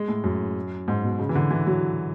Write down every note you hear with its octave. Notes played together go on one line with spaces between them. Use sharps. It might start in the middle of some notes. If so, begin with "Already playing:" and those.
Already playing: G#3
A2
F#2
G#2
B2
C#3
E3
D3
E3
F#3